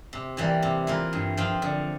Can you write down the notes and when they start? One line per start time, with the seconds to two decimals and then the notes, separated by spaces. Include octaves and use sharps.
0.13 C3
0.37 E3 G3 A#3
0.62 C3
0.87 E3 A#3 F4 A#4
1.13 G2
1.37 F3 C4 F4
1.62 D3